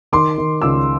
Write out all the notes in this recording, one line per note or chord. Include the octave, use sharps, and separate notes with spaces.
D#3 C6 D6
D#3
C#2 D6 E6